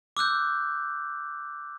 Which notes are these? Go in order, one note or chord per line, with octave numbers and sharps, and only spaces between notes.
D6 E6 F#6 G6